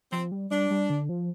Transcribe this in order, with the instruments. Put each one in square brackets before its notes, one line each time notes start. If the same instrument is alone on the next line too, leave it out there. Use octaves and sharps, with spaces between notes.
[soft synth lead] F3 [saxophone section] C4
[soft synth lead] G3
[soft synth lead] G3 [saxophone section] D4
[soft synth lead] G3
D3
F3